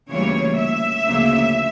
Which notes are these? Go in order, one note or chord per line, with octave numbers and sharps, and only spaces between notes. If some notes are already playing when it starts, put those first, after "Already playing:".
D2 C#3 E3 G3 A#3 C#5
E5
D2 C#3 F3 A#3